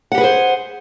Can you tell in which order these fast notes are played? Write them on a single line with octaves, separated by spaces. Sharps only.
F#5 G4 B4 G#4 C5